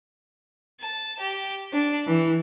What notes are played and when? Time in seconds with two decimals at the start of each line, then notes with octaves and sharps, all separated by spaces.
0.80 A5
1.19 G4
1.73 D4
2.06 E3